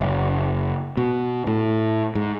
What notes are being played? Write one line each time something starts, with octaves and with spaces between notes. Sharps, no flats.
F#1
B2
A2
G#2